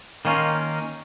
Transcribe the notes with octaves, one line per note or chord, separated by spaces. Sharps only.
D#3 A#3 C#4 F4